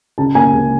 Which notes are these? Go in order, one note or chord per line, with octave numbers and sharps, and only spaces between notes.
C#3 A5
A#3 G#5
C#2